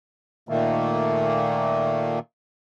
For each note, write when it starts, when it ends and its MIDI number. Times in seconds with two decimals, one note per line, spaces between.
0.49 2.19 46
0.49 2.19 51
0.49 2.19 57
0.49 2.19 58